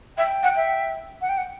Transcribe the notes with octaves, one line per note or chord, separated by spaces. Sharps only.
E5 G5
F#5
E5
F#5
G5
F#5